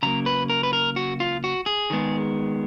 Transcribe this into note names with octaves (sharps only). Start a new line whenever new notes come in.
C#3 F#3 A#3 A#5
B4
A#4
B4
A#4
F#4
F4
F#4
G#4
D#3 G#3 B3